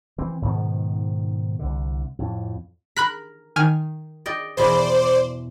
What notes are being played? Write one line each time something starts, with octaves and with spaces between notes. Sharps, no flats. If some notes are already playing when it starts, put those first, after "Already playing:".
E3 C4
G#2 B2 D#3 F3
C2 D3
F2 A2
A#4 B5 F#6 B6
D#3 G#5 F6
D5 D#5 G5
E2 B2 C5 D5 B5